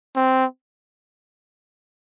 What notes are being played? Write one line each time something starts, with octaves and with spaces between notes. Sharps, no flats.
C4